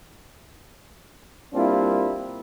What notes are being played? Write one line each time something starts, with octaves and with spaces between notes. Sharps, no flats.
G3 A#3 C4 D4 E4 F4